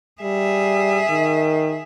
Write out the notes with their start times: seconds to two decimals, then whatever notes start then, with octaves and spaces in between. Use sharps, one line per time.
0.22 G3 G#4 E5
1.10 D#3